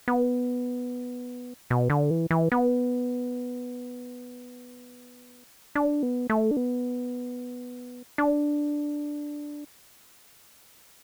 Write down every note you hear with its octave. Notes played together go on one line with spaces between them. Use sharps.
B3
B2
D3
E3
E3
B3
D4
B3
A3
D4
B3
D4